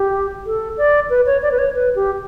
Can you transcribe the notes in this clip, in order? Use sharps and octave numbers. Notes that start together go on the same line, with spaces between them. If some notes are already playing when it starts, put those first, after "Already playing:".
Already playing: G4
A4
D5
B4
C#5
D5
B4
C#5
B4
G4